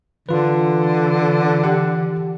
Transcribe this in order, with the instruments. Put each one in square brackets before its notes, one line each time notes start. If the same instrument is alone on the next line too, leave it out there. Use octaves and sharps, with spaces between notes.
[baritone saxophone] D3 [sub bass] E3 [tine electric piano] F4 B4
[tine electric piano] G4 F#5